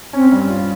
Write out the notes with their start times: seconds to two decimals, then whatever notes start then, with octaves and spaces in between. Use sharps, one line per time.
0.13 C4 C#4
0.32 G2
0.50 F4